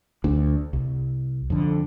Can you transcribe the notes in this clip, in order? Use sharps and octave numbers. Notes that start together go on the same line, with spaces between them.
D2 D4
C2
F2 D3